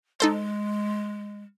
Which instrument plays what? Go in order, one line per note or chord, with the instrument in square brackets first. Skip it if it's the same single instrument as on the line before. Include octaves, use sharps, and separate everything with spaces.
[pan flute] G#3 [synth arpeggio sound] D#4 A4 C5